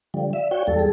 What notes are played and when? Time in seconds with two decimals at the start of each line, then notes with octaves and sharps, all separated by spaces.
0.14 D3 F3 G3
0.33 D5 E5 F5
0.51 F#4 C#5 G5
0.67 E2 G3 A4
0.79 G#4